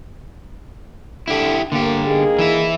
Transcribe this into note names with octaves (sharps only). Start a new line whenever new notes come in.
D3 E4 G4
D3 A#3 G4
A#3 D#4 G#4
E3 E4